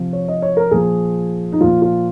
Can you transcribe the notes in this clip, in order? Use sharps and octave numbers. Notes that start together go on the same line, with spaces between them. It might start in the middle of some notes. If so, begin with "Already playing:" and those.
Already playing: C3 F3
C#5
D#5
C#5
A#4
A#2 F3 G#4
D#4
A#2 F3 F4
F4